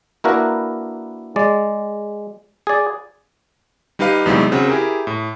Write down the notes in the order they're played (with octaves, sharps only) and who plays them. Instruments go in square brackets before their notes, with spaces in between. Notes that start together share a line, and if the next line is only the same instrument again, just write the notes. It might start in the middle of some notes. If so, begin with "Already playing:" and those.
[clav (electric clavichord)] A#3 D4 E4 F#4 A#4 B4
G#3 D5
G#4 D5
[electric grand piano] G3 D#4 G4 B4 F5
E2 C3 F#3 G#3 D#4 E4
C#3 C4 F#4
E4 G4 G#4 A#4
A2